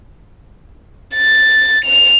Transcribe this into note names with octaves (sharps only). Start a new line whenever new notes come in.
A6
F7